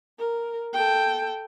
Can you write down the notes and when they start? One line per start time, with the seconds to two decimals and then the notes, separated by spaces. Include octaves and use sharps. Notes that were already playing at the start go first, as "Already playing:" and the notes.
0.18 A#4
0.73 A4 G5